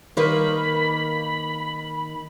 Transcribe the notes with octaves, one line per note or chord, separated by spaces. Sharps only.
D#3 A#3 B4 B5